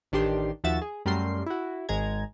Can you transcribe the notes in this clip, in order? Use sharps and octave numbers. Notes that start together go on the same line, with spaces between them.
A1 D#3 D4 G4 C6
D#2 F3 F#4 E5 A6 E7
G#4
F#2 G3 A3 A#4 C6 C7
E4 F#4
G#1 G#3 A#5 G#6